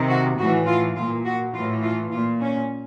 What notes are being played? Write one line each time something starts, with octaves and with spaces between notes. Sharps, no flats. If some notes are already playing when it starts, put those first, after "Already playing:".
Already playing: C3 D#3
F#4
A2 E3 F#4
F4
A#2 F4
F#4
A2 E3 F4
F4
A#2 F4
C#4